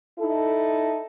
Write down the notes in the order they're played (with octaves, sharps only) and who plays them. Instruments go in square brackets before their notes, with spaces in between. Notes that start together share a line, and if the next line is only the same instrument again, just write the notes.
[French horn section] D#4 E4 A4